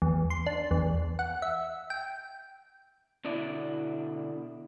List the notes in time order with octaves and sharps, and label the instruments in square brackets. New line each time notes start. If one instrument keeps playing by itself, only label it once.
[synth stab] E2
C6
D4
E2
F#5
E5
G5
[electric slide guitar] B2 D3 E4 D5